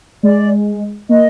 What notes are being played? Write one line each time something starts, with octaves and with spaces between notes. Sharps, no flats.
G#3 D5
A#3 D#5